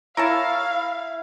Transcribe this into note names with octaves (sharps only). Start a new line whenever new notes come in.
E4 A#4 C#5 F5 A5